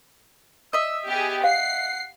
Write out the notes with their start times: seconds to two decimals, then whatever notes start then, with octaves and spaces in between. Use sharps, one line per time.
0.73 D#5 E5 E6
1.08 B3 G4 G#4
1.44 F5 F#5 C7